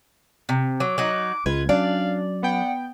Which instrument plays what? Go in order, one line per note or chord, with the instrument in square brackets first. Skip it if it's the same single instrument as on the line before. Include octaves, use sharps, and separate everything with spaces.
[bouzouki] C3
[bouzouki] F#3 [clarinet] D6
[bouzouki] F#3 D#4 [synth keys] F#6
[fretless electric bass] C#2 G#3 [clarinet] F4 [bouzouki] B4 [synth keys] G#6
[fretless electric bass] F#3 C#4 [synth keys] D4 [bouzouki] D5 [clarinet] F5
[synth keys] B3 G5 [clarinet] F#5